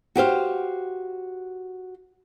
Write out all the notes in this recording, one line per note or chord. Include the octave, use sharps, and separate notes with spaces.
F#4 G4 C5 F5